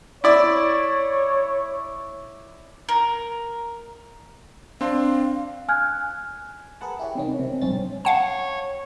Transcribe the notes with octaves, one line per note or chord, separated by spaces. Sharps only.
E4 C#5 D5
A#4
C4 D4 F5 C6
G#5 F6 F#6 G#6
G#4 A#4 B4 F#5 A5
E4 G4 C#5
C3 D#3 C#4
C3
B1 G2 C4 C#4 A6
C#5 F5 F#5 A5